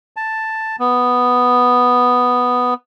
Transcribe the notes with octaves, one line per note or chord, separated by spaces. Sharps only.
A5
B3